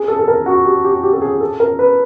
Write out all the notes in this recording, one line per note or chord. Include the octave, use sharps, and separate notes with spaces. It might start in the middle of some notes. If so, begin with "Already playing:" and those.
Already playing: G#4
A4
A4
A#4
F#4
G4
G4
G4
A4
G#4
A4
A#4
B4